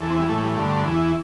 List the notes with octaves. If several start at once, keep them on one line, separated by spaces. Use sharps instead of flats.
E2 E3 A4
C4
G3
A2 E3 A3
G3
G2 D3 A3
E2 E3